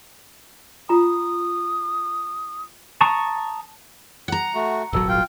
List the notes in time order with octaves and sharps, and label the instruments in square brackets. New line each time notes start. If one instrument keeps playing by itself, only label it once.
[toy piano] F4 A#5 [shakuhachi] D#6
[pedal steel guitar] A5 A#5 C#6 D#6
[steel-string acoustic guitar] F#5 A#5
[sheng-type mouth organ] A3 F#4
[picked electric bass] D#1 G#1 F#3 [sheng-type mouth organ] A4
[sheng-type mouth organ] F4 G5